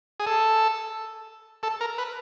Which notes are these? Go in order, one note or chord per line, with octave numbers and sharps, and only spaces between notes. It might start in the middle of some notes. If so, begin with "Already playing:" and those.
G#4
A4
A4
A#4
B4